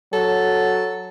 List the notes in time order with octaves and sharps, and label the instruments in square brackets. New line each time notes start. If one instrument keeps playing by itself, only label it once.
[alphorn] F#3 [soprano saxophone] A4